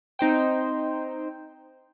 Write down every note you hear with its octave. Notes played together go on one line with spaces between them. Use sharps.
C4 D#4 C5 G5